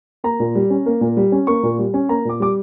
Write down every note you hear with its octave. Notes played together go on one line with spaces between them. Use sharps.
A#3 A#5
A#2
G3
C#4
A#3
A#2
G3
C#4
A#3 C#6
A#2
G3
C#4
A#3 A#5
A#2 D6
G3 D6